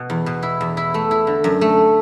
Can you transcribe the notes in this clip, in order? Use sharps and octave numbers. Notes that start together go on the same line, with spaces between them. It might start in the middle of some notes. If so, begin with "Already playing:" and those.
Already playing: B2
E2
B2
E4
E2
E4
A3
E4
D3
F#2
A3